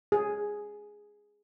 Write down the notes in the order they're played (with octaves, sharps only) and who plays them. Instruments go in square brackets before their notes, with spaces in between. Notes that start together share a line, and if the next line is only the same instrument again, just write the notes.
[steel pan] G#4